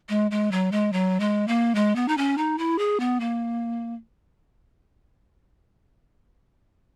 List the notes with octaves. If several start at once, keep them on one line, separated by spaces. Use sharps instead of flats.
G#3
G#3
F#3
G#3
F#3
G#3
A#3
G#3
B3
D#4
C#4
D#4
E4
G#4
B3
A#3